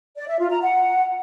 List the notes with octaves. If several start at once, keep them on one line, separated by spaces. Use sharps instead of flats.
D5
E5
F4
A#5
F#5